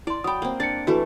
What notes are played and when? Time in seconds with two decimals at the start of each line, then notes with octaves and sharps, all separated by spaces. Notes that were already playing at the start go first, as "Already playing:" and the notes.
0.07 E4 D5 C6
0.24 F#3 G5 B5 D#6
0.42 A#3 C4
0.60 D4 D5 A6 C#7
0.87 E3 A3 F#4 A4 B4